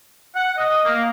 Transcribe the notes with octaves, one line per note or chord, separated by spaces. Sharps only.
F#5
D#5
A#3